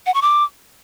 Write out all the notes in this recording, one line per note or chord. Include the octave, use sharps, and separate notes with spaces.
F#5
C#6
D6